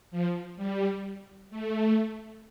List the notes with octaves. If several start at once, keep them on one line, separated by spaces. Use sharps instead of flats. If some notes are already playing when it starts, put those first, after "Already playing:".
F3
G3
A3